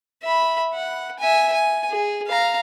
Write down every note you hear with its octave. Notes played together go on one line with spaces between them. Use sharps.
E5 B5
F#5
E5 G#5
G#5
G#4
F5 A#5